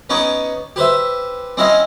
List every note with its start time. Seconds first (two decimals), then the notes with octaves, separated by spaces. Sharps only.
0.10 B3 C#4 D#4 C#5 C#6 D6
0.76 G4 B4 C5 E5
1.57 C4 C#4 E4 D#5 F5